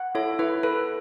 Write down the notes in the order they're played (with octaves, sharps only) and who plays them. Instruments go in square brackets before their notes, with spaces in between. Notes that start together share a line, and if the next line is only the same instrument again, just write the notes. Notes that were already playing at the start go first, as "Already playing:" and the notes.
Already playing: [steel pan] F#5
[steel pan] E4 [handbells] A4 C#5
[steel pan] E4 [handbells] B4
[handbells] A4 [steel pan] B4